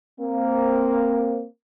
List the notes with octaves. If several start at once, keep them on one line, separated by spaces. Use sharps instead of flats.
A#3 C4